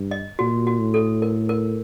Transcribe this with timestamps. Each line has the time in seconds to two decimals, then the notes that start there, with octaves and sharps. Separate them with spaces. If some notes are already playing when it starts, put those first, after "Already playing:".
Already playing: G2
0.11 D#5
0.39 A#2 F#4
0.67 F#4
0.80 A2
0.94 A4
1.22 A#4
1.49 A#4